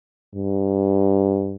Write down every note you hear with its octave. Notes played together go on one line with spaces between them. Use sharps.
G2